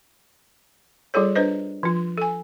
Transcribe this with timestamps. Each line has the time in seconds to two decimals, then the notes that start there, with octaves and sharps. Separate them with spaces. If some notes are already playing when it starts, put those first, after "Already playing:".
1.14 G3 F4 G#4 A4 C#5
1.35 D4 B4 C5 D#5
1.83 F3 F4
2.18 A4 G#5